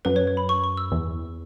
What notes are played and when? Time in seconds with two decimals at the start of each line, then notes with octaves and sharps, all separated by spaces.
0.05 F#2 B4
0.16 C#5
0.27 C#5
0.37 B5
0.49 C#6
0.64 C#6
0.77 E6
0.92 E2